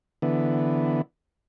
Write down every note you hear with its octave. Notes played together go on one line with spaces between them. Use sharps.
D3 E3 B3